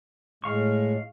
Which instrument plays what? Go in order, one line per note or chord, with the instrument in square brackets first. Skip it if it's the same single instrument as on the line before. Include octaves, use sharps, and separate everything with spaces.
[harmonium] A2 G#3 [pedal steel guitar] F5 C#6